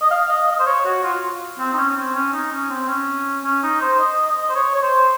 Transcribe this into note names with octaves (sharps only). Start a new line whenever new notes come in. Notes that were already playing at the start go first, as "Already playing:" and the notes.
D#5
F5
D#5
D#5
C5
C#5
F#4
F4
C4
D#4
C#4
C#4
C4
C#4
D#4
C#4
C4
C#4
C#4
D#4
C5
D#5
D#5
C5
C#5
C#5
C5